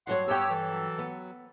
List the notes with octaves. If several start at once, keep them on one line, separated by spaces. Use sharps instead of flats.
G2 F#3 C#5 F#5 C6
G2 B3 G4 C#5 G5 E6
E3 A4
F#3
B3